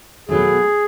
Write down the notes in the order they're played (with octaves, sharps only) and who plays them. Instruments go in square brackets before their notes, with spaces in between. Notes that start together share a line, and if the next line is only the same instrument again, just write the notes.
[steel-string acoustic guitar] B2 F#3 A3 [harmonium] G#4